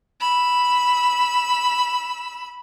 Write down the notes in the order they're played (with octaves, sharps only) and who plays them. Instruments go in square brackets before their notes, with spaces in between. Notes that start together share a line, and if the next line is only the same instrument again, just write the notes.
[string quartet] B5 E6